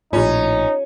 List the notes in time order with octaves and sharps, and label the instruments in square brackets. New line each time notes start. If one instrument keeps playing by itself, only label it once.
[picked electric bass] A#1 A2 [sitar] C#4 [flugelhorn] D#4 [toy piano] F4 G4